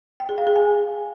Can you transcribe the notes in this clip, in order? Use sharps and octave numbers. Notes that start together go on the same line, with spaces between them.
G5
G#4
F5
G#4
G#5